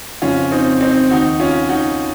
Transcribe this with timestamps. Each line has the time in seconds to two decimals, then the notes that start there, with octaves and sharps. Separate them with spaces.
0.22 F2 C#3 F3 C#4 F4
0.51 C4 D#4
0.80 C4 D#4
1.10 D#2 D#3 D#4 F#4
1.40 C#4 F4
1.69 D#4 F#4